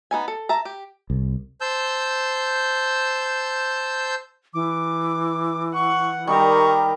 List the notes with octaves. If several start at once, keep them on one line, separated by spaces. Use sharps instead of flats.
B3 D#4 G#5
A4
E5 A5 A#5
G4
C2
C5 A5 E6 G6
E3 D6
F#5 C#6
D#3 G3 D#4 G4 A#4 C#6